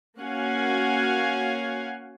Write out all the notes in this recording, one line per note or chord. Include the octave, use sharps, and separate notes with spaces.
A#3 C#4 F#4 F5 F#5 G#5